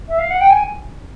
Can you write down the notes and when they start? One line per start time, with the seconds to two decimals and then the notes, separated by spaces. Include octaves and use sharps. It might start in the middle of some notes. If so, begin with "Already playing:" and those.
0.08 E5
0.18 F5
0.30 F#5
0.40 G5
0.50 G#5